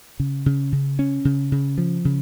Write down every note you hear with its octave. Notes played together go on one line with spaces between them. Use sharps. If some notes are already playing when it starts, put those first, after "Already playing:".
C#3
C#3
C#3
C#4
C#3
C#3
F3
C#3